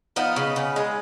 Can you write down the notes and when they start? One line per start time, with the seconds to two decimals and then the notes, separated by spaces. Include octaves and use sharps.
0.16 F3 B3 D#4
0.36 C#3
0.56 C#3
0.76 G#3